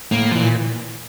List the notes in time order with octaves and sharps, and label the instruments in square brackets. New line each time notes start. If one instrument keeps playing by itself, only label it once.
[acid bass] A2 [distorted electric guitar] A#3
[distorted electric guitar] F3
[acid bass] A#2 [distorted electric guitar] E3